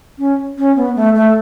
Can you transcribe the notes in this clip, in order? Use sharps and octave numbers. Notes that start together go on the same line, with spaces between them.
C#4
C#4
B3
A3
A3